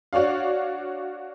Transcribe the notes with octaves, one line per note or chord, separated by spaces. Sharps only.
D4 F#4 C#5 D5 F5